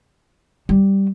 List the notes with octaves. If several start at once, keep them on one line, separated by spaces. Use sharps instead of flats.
G3